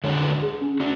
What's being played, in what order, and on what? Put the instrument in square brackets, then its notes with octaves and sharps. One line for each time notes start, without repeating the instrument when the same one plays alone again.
[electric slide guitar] D3 G#3 D4 F#4 [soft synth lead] C#5
[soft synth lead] B4
G#4
C#4
[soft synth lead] C#4 [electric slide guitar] D4 F#4